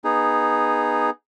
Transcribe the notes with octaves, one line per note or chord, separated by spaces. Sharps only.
B3 D#4 G#4